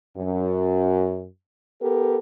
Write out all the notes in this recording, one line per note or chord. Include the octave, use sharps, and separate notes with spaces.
F#2
B3 G4 A4 A#4